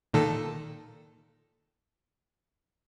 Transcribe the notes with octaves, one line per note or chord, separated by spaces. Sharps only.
A#2 D#3 A4